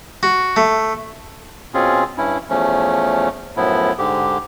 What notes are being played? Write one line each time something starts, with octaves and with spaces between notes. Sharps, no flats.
F#4
A3
B2 C4 C#4 F4 G#4
G2 C#4 E4
E2 F3 A3 C#4
F#2 A2 F3 B3 E4
G#2 D3 G4